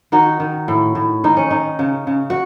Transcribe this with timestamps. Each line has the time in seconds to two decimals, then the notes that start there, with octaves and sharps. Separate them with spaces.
0.12 D#3 D#4 F#4
0.40 D#3
0.68 A2
0.95 A2
1.24 D#3 D#4
1.37 C#4
1.51 D#3 D#4
1.79 C#3
2.07 C#3
2.30 F#4